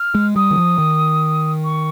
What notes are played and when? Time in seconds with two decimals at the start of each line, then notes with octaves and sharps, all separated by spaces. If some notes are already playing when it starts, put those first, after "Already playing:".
Already playing: F6
0.15 G#3
0.36 G3 D#6
0.51 D#3
0.58 F3
0.78 D#3
1.64 C#6